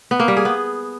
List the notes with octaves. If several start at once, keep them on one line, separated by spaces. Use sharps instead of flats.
B3
A#3
G3
G#4
B3